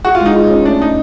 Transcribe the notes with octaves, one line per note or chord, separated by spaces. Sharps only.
F#4 G#4
F4
G#3 D#4
F4
C#4
A3 D4
D#4